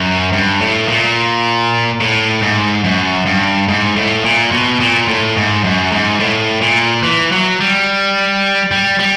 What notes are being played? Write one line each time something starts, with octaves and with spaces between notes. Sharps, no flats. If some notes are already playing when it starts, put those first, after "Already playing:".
Already playing: F#2
G2
A2
A#2
A2
G#2
F#2
G2
G#2
A2
A#2
B2
A#2
A2
G#2
F#2
G#2
A2
A#2
E3
F#3
G3
G3
G3